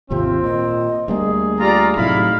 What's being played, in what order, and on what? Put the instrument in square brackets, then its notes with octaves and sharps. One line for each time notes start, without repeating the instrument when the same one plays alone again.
[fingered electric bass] G#1 D#2 C3 [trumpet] C4 [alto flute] F4
[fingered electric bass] A#2 [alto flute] D#5
[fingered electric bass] D2 G3 A#3 [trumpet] G#4
[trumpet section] F4 D5 A#5 [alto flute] G4
[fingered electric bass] A2 C3 F#3 [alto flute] D#4 [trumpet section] E4 F5 B5